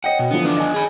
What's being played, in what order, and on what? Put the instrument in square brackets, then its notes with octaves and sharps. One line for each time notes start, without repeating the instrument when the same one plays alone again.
[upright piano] C#5 D#5 G5 [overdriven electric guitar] F#5
[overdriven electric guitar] B2
[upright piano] D3 E3 F3 [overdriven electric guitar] B3
[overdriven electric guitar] B3 D4
[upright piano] D#5 G#5
[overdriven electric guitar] G#4 B5